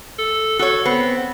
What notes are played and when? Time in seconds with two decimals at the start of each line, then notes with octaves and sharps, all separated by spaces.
0.19 A4
0.59 F#4 A4 C#5
0.85 B3 C4